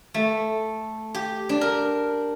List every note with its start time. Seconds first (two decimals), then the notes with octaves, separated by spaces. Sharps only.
0.14 A3
1.14 G4
1.49 D4
1.61 A#4